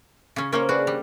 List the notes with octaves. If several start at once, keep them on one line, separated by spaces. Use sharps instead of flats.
C#3 C#4
A#3 C#4 A#4 C5 C#5
D4 F#4 G#4 B4
G3